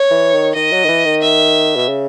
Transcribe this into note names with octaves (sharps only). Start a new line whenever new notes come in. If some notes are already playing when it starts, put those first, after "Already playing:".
Already playing: C#5
E3
D#3
D#3 D#5
F#3
D#3
E3
D#3
E5
B2
C#3